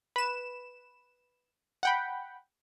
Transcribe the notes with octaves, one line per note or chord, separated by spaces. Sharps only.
B4 E7
F#5 G5 B5